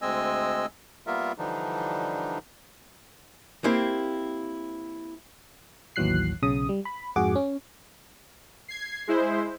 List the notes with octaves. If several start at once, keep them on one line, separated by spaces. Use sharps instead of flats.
D2 G#3 C4 D#5 G#5 E6
G3 A#3 B3 F4 A#4 E5
D3 E3 F3 G3 D4 D#4
A#3 C4 E4 G4
A1 D#2 E3 F#3 F#6 C7
B1 C#3 D#6
G3
B5
F2 G#2 F#4 G#4 F#5 D6
C#4
G#6 C7
G#3 E4 C5